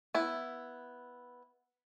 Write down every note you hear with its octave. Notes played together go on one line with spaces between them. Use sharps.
B3 E4